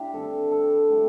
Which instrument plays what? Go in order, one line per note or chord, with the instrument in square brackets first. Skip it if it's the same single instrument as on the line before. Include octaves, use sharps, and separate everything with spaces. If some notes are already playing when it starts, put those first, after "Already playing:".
Already playing: [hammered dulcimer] D4 E4 G4
D3 G3 C4 A4
A4
A2 G3 C4